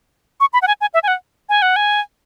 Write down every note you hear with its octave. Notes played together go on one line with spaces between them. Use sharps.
C#6
B5
F#5
G#5
G#5
E5
G#5
F#5
G#5
F#5
G#5